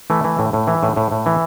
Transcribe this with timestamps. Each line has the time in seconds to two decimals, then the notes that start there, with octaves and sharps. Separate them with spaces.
0.10 E3 A3
0.24 E3
0.39 A2
0.53 A2
0.67 E3
0.83 A2
0.96 A2
1.12 A2
1.26 E3